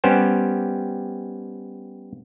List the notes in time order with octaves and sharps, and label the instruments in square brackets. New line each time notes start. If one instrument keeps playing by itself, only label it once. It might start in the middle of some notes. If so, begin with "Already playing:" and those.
[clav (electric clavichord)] G3 B3 C#4 G4 C5